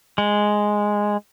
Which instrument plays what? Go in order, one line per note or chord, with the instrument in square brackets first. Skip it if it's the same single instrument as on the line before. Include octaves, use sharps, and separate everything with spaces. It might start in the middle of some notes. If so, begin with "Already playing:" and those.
[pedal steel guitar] G#3